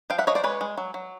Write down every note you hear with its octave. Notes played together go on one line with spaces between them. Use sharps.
F3 F5 G5
E5 F#5
F3 C#5 D#5
C5 D5
G#3 B4 C#5
G#3
F#3
F#3